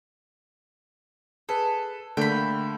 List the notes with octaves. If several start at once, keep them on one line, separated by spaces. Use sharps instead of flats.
G#4 A4 B4
D3 A3 A#3 G5 B5